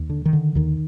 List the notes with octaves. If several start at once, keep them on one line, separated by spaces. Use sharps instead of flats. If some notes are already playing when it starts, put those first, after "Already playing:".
Already playing: D#2
D3
D#3
D3
D#2 D#3